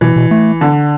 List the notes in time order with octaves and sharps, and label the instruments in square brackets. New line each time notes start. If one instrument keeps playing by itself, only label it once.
[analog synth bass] B2 [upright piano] E3
[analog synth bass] B2
A3
[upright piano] D3